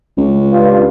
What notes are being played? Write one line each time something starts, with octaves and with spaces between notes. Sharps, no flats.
C#2
G2 F4